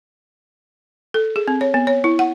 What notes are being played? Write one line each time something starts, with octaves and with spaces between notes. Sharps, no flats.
A4
G#4
C4
C#5
B3
C#5
E4
F#5